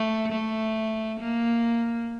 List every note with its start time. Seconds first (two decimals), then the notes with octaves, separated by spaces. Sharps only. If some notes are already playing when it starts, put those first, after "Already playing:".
Already playing: A3
0.32 A3
1.20 A#3